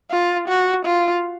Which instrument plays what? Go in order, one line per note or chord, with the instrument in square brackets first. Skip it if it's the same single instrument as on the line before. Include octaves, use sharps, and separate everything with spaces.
[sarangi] F4
F#4
F4